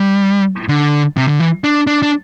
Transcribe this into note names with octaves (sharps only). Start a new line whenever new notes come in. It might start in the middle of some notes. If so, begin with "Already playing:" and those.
Already playing: G3
D3
C3
D3
E3
D4
D4
D4